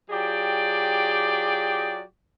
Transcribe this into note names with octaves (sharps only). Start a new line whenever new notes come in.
F#3 F4 G4 G#4 D5 G5